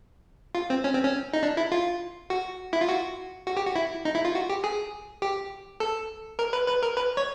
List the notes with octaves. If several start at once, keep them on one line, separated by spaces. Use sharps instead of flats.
F4
C4
C#4
C4
C#4
D#4
D4
E4
F4
F#4
E4
F4
F#4
F#4
G4
F#4
E4
D#4
E4
F4
F#4
G4
G#4
G4
A4
A#4
B4
B4
A#4
B4
C#5